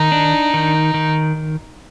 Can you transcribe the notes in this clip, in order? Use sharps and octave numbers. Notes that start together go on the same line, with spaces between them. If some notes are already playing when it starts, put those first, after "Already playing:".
Already playing: D#3 D#4
D4
D#3
D#3